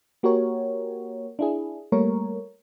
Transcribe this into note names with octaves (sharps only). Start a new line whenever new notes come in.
A#3 F#4 G4 A#4 C#5
D4 E4 G#4
G3 A3 A#3 A#4 C#5